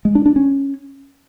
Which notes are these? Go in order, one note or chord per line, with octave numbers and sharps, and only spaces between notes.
G#3
D4
D4
C#4